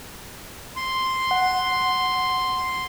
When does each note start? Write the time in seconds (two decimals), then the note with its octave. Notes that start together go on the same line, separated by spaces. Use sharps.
0.76 C6
1.31 F#5